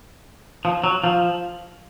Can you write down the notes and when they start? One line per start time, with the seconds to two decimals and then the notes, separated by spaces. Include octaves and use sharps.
0.65 F3
0.84 F#3
1.04 F3